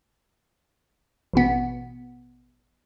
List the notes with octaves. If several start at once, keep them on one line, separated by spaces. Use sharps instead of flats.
A1 B2 B3